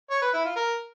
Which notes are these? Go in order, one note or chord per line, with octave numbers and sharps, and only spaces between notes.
C#5
B4
E4
F4
A#4